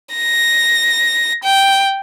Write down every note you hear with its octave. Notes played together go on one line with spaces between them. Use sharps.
A#6
G5